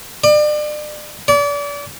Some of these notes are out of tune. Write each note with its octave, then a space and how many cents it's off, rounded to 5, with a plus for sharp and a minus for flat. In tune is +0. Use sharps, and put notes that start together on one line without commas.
D5 +35
D5 -35